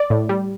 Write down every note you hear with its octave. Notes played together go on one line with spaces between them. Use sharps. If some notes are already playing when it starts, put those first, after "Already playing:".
Already playing: D5
A2
G3